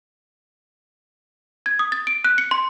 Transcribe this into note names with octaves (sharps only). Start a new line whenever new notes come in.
G#6
D#6
A6
D7
F#6
C#7
C6